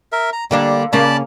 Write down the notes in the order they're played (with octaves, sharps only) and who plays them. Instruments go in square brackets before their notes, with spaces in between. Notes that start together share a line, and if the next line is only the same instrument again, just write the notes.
[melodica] A#4 E5
A#5
[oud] D3 A#3 D4 [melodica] G3
[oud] C#3 A#3 C#4 [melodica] D5 A5 B5